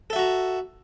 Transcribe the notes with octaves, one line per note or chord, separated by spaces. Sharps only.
F#4 A4 E5 A#5